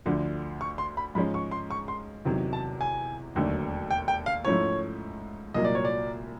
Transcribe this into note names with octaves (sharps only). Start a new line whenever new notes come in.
D2 D3 F3
C#6
C6
B5
G#2 F3 G#3 C#4 B5
C#6
C6
C#6
C6
E2 C3 D#3 F#3
A5
G#5
E1 D#2 D3 F#3 A3
G5
G5
F5
G#2 F3 A3 C#4 E4 C#5
C2 A#2 F#3 A#3 D#5
D5
C#5
D5